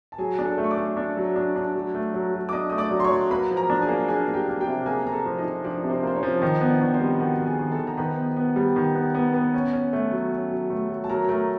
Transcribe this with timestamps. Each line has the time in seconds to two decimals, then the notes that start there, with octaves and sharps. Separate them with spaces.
0.12 A5
0.18 F#3 G#4 G#5
0.39 D4
0.45 A4 A5
0.58 A3
0.64 C#6
0.71 D5 D6
0.77 A3
0.97 D4
1.17 F#3
1.36 D4
1.56 D4
1.75 F#3
1.95 A3
2.14 F#3
2.34 F#3
2.49 D6
2.53 D4 D#5 D#6
2.70 A3 D#6
2.78 D5 D6
2.91 F#3
3.00 C6
3.04 C#5 C#6
3.11 F#3
3.30 A#3 B4 B5
3.50 F3
3.56 A#4 A#5
3.70 D4
3.82 G#4 G#5
3.89 A#3
4.08 D4 G#4 G#5
4.27 A#3
4.34 G4 G5
4.48 A#3
4.61 G4 G5
4.67 C3
4.86 A#3 G#4 G#5
5.05 A#3 A#5
5.12 A4 A5
5.26 F3
5.38 D#4 D#5
5.44 F3
5.64 F3 D4 D5
5.83 C3
5.90 C4 C5
6.03 A#3 C5
6.16 C#4 C#5
6.23 F3
6.42 D#3 D#4 D#5
6.61 B3
6.68 D4 D5
6.81 D#3
6.94 C4 C5
7.01 G3
7.20 D#3 F#4 F#5
7.40 D#3
7.45 G#4 G#5
7.59 D#3
7.72 A4 A5
7.79 D#3
7.87 A#5
7.97 D#3 B4 B5
8.17 B3
8.36 B3
8.56 G3
8.76 D#3
8.95 B3
9.15 B3
9.34 B3
9.54 C#4
9.73 C#4
9.93 A3
10.12 F#3
10.32 C#4
10.51 F#3
10.70 A3
10.89 F#3
11.04 A5
11.09 F#3 A#4 A#5
11.29 A3 A#4 A#5